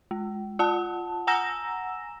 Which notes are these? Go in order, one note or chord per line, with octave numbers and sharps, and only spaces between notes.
G#3
F4 F#5 A5
F#5 G#5 A#5 E6 A#6 E7